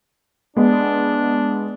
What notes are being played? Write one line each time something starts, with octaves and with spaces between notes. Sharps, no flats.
G#3 B3 D4